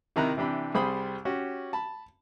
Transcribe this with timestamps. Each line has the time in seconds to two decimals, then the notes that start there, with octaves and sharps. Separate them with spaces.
0.16 C3 D#3 E4 A#5 B5 F#6
0.37 C3 E3 D4 G4 B5
0.74 C2 G3 G#4 C5 B5 D#6
1.25 C#4 F#4 G4
1.73 A5 B5